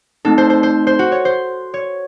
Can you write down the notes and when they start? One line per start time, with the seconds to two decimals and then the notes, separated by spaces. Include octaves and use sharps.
0.25 A3 C4 D#4 A4
0.38 C5
0.50 C5
0.63 C5
0.87 C5
0.99 F#4
1.12 C#5
1.25 C5
1.74 C#5